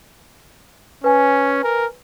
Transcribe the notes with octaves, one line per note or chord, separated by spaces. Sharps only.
C#4 B4 G#5
A#4